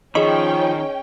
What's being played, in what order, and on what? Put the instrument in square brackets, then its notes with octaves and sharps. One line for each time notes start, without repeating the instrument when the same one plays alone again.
[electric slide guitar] D#3 [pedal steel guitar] F3 C#5 B5 [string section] C#4 G5 [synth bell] G#4 D#5